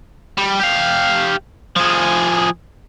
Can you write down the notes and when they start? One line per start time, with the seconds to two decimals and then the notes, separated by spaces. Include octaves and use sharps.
0.38 G3
0.60 G4 F5
1.76 F3 G#4